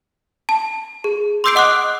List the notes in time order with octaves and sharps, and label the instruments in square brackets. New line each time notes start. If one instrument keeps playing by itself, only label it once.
[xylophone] A5
G#4
C6 D6 E6 G6 C7 D7
D#5 F#5 D6 D#6 F#6